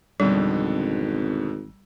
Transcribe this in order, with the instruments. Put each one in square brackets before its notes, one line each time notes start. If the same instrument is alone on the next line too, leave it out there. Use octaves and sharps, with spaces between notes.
[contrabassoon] G#1 [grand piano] F2 B2 D3 [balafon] G3